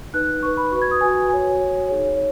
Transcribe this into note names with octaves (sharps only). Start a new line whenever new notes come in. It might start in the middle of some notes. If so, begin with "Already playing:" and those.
D#4 B4 F#6
D#4 B4 C#6
B5
F#4 B4 C#6
G#6
D#6
F#4 B4 G#5
F#4 C#5 G#5
F#4 C#5
D#4 G#4 C#5
C#5